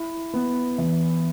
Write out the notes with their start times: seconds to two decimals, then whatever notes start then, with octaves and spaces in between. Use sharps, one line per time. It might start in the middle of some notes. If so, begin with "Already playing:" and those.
Already playing: E4
0.34 B3
0.78 E3